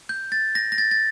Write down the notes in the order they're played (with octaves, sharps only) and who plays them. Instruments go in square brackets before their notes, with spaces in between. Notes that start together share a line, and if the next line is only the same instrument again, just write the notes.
[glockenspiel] G6
A6
A#6
A#6
A6
A6